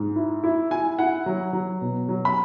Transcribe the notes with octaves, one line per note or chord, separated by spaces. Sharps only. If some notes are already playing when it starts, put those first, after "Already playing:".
Already playing: G#2
E4
E4
E4 G#5
E4 F#5
F#3
F#3
B2
F#3
B5